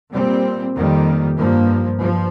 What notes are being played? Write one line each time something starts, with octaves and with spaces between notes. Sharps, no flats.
A#2 G3 C4
F2 D#3 G3 A#3
G2 F3 A#3
G2 F3